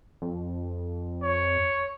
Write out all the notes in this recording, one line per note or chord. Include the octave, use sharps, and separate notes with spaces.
F2
C#5